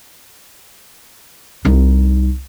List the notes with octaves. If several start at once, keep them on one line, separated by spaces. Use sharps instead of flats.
C2 D#4